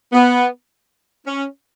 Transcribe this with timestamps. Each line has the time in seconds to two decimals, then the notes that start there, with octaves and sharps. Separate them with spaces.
0.13 B3
1.26 C#4